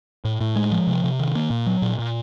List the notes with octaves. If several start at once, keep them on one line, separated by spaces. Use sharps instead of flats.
A2
A2
G#3
F3
C3
C3
D#3
A#3
A#2
F#3
A#2
A#2